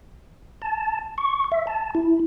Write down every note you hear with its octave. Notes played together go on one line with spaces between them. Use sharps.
A5
C#6
E5
A5
E4